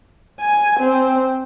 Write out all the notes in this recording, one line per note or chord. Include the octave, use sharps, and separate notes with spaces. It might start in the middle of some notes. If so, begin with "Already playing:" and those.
G#5
C4